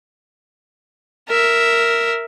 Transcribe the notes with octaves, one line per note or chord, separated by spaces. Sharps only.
A#4 E5